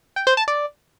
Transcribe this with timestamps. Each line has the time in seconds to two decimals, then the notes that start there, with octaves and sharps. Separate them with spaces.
0.16 G5
0.27 C5
0.37 A5
0.48 D5